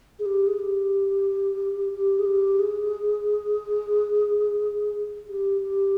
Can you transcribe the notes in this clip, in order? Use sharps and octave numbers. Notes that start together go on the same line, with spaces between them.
G#4
G4
G#4
G4
G4
G#4
G4
G#4
G4
G4